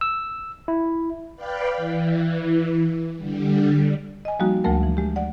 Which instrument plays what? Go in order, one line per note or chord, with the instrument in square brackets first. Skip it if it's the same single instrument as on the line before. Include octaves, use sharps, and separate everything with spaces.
[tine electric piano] E6
E4
[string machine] B4 D5 F5 G5 B5
E3
D3 G3
[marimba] D#5 G#5
F3 G3 A#3 D#4 F#4
D2 F3 G#3 A3 A#4 F#5
E3
G#3 G4
D5 F#5